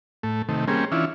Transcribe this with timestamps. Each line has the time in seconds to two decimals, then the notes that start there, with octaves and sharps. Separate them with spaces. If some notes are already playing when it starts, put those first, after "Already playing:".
0.23 A2 A3
0.49 C3 D#3 A3
0.68 G3 A#3 C4 C#4 G#4
0.92 E3 C#4 D4 E4 F4